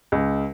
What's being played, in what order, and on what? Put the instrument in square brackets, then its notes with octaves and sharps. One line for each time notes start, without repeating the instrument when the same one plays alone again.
[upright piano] C#2